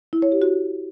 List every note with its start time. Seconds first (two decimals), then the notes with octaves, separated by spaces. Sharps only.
0.13 E4
0.22 C#5
0.32 G4
0.42 F#4